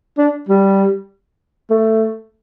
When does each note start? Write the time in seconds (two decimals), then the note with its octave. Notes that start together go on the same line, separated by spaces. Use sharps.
0.18 D4
0.49 G3
1.70 A3